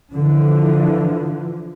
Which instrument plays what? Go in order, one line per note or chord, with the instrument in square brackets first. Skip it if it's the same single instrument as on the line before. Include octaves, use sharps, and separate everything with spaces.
[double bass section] D3 E3 F3